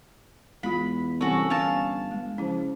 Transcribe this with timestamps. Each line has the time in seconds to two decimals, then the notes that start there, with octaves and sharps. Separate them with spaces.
0.63 E2 G#3 F4 B5
1.21 C2 E3 C#4 F#4 A4
1.50 G1 F5 A5
2.11 G#3
2.38 C#3 F3 C#4 E4